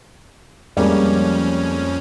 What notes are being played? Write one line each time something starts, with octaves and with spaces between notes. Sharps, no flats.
F2 G3 G#3 A#3 C#4